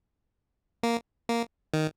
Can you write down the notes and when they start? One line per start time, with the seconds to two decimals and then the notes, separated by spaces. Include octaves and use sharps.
0.83 A#3
1.29 A#3
1.74 D#3